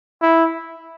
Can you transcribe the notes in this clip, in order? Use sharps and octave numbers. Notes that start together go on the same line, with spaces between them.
E4